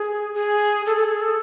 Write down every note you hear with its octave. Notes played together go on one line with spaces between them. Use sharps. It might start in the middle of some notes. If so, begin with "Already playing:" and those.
Already playing: G#4
G#4
A4
A4
G#4
A4